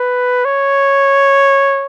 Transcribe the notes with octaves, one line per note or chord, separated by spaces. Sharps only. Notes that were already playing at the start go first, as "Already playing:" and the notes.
Already playing: B4
C#5